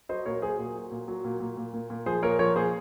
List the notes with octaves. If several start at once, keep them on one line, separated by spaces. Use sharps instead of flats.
F#3 C5 D#5
A#2 A#4 C#5
F#3 G#4 C5
A#2
F#3
A#2
F#3
A#2
A#2
A#2
A#2
A#2
F3 G#4 C5
A#2 A#4 C#5
F3 A#4 C#5
A#2 G#4 C5